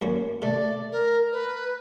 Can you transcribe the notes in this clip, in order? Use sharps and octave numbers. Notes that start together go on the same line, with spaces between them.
F#2 A#3 C#4
C3 A3 D5
A#4
B4